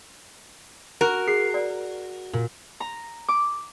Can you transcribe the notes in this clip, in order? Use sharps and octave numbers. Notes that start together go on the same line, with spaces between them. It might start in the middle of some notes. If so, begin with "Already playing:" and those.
F#4 A#4
G#4 C7
D5
A#2
A#5
D6